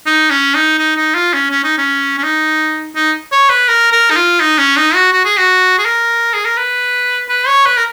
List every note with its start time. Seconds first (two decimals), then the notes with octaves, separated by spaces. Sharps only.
0.06 D#4
0.30 C#4
0.54 D#4
0.78 D#4
0.96 D#4
1.15 F4
1.33 C#4
1.51 C#4
1.64 D#4
1.78 C#4
2.18 C#4
2.23 D#4
2.95 D#4
3.32 C#5
3.50 B4
3.68 A#4
3.92 A#4
4.10 D#4
4.16 F4
4.40 D#4
4.58 C#4
4.77 D#4
4.94 F#4
5.13 F#4
5.25 G#4
5.37 F#4
5.78 G#4
5.85 A#4
6.34 G#4
6.45 A#4
6.57 B4
7.29 B4
7.48 C#5
7.66 B4
7.77 A#4